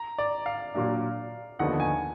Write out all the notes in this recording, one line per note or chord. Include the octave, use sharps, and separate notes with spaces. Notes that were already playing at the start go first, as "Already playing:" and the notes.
Already playing: A#5
D5
F5
A#2 F#3 A#3 D4
D#2 D3 F3 B3 D#4 F#5
G#5